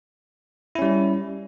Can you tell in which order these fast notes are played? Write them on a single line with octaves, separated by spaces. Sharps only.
E4 C#4 G3